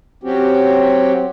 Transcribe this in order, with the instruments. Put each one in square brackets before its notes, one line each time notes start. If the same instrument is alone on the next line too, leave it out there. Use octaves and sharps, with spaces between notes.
[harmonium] F#3 C4 C#4 F#4 G4